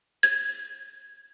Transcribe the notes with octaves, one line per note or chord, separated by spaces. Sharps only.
G#6